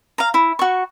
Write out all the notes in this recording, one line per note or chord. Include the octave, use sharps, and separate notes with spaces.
F5 A#5
E4
F#4 C#6